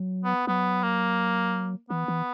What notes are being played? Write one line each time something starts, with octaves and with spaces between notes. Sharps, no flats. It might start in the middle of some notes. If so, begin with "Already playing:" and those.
Already playing: F#3
B3
F#3 B3
A#3
E3 B3
E3